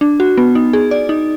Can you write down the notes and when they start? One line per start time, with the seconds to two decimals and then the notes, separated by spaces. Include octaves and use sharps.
0.01 D4
0.20 F#4
0.38 B3
0.55 D#4
0.73 G#4
0.91 D5
1.09 D#4